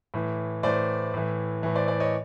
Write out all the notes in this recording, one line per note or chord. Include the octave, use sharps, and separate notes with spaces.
A2 E3
A2 E3 C5 D5
A2 E3
A2 E3
C5 D5
C5 D5
C#5 D#5